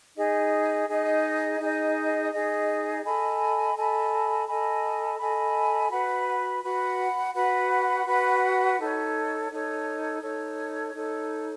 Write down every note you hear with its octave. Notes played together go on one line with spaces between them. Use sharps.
D#4 G#4 D#5
D#4 G#4 D#5
D#4 G#4 D#5
D#4 G#4 D#5
A4 D#5 G#5 B5
A4 D#5 G#5 B5
A4 D#5 G#5 B5
A4 D#5 G#5 B5
F#4 B4 F#5 B5
F#4 B4 F#5 B5
F#4 B4 F#5 B5
F#4 B4 F#5 B5
D#4 A4 C#5
D#4 A4 C#5
D#4 A4 C#5
D#4 A4 C#5